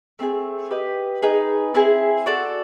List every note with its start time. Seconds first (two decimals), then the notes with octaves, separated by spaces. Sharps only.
0.19 A3 C4 D#4 G#4
0.70 G4 B4 D#5
1.22 D#4 G#4 B4
1.74 C4 E4 G#4
2.26 F#4 A4 D5